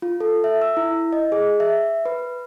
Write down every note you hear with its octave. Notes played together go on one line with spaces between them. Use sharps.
F4
A4
E5
E6
E4
D#5
G#4
E5
B4